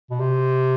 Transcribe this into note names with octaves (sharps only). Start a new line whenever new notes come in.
B2
C3